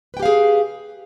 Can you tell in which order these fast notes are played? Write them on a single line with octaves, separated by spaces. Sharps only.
B4 G5 G4 F5 G#4